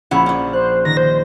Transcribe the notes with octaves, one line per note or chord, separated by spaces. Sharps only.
A#1 C#4 E4 F#5
C#4 D4
C5 F#6
D#3 A#6
C5